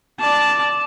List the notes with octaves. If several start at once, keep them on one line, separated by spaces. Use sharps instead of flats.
D5 A5